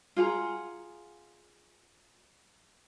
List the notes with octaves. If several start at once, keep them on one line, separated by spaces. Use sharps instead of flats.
F4 G#4 F#5 A#5